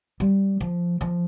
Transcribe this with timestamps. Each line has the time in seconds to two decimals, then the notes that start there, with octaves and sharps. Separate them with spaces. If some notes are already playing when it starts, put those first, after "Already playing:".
0.20 G3
0.61 F3
1.01 F3